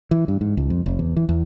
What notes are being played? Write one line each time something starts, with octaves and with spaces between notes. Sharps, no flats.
E3
G2
G#2
C#2
F2
F1
E2
E3
E2